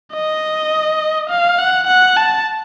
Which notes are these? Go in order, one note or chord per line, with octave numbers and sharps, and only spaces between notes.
D#5
F5
F#5
F#5
A5